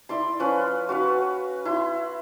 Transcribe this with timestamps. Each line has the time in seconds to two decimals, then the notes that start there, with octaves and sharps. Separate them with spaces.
0.09 E4 D5 C6
0.40 F3 C#4 B4
0.89 F#4 B4 F5
1.65 E4 C6